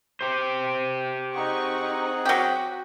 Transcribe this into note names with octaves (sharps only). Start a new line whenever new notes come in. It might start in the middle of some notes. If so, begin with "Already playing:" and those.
G4 C5
C4 D#4 G#4 F#5 C#6
F#3 F#4 G4